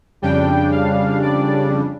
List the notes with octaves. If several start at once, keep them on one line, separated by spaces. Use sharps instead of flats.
F2 C#3 G3 D4 G5
F5
D5